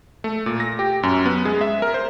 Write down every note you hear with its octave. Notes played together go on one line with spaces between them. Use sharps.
A3
A#2
A#6
G4
F#2
B3
G#3
E5
A#4
C5